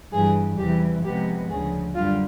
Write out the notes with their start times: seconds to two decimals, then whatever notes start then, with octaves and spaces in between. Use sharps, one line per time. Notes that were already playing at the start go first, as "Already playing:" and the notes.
0.12 G2 E3 G3 G#4
0.58 E2 C3 E3 G3 G4
1.04 C3 F3 G#3 B3 G4
1.49 D2 C#3 F3 G#4
1.94 F#2 D3 G3 F4